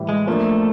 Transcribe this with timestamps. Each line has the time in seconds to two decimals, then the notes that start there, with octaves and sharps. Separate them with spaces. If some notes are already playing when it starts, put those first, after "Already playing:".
Already playing: A2 E3 G3
0.09 G#3
0.27 F3 A3 A#3 D4